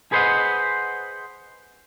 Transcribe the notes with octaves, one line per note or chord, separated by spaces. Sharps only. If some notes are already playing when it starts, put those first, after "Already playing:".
G#4 B4 C5 D#5 F#5